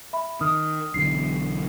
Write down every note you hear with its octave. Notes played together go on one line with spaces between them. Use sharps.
E5 B5
D#3 D#6 F6
B1 D3 E3 C7